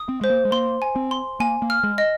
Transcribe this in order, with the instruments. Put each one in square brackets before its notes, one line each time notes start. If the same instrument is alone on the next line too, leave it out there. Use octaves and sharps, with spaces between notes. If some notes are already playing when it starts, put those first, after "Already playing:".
Already playing: [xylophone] D#6
[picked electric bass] C4
[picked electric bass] G#3 [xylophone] C5
[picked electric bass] A#3
G#3
[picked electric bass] A#3 [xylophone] C6
[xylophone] G#5
[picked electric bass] C4
[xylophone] C6
[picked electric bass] A#3 [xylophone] G#5
[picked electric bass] A#3
[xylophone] F6
[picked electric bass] G#3
[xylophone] D#5